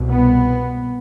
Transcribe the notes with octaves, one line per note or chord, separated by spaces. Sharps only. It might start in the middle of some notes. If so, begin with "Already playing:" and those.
Already playing: C2 B2
B3